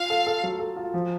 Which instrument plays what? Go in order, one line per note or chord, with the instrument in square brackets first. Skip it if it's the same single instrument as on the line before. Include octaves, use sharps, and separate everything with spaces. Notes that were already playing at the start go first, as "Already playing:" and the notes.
Already playing: [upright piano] F4 [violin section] F5
[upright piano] A4
A4
F#3
A4
F4
F3